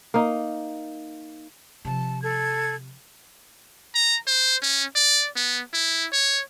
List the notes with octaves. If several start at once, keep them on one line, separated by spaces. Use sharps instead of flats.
A#3 D#4
C3 F3 A5
A4 G#6
A#5
C5
C#4
D5
B3
E4
C#5